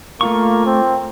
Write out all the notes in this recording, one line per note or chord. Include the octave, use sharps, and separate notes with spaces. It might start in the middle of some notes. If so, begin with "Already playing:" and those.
A3 A#3 F4 C#6
C4